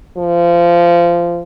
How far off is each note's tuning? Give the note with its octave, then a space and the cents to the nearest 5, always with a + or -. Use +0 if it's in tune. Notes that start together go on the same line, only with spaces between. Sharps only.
F3 -20